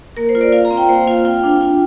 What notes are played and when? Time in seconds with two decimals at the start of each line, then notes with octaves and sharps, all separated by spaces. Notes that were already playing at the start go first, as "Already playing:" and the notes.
0.17 A#3 A#4
0.29 C5
0.35 F4
0.41 D5
0.52 F4 F5
0.65 A#5
0.71 C4
0.77 G5
0.89 A#3 C5
1.07 F4 F5
1.25 F4 G5
1.43 D4
1.61 F4